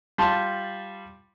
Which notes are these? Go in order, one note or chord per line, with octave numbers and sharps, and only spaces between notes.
G3 F4 A5 C6